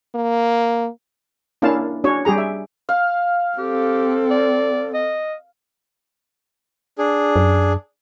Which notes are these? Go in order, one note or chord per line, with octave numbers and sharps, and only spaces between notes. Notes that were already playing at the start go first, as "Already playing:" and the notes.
A#3
A#3 C#4 D4 E4 F5 A5
C#4 D4 F#4 C#5
G3 G4 G#4 A#5
E5
F5
C4 G4 A4
D5
D#5
D4 G#4
F#2